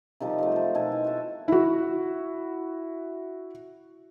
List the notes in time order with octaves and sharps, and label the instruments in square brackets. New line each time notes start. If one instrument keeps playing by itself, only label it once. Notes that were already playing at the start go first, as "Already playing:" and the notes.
[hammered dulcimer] C3 D#3 F3 G3
F3 F#3 A3
C5 A5
B2 D#3 A4 G#5
E4
F#4 E5
[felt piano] E4 F#4